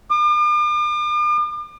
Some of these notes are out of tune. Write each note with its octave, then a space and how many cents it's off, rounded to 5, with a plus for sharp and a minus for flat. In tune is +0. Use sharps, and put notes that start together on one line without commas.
D6 +45